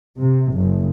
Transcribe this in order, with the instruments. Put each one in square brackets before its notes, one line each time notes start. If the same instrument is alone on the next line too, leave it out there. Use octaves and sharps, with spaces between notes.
[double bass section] C3
F#1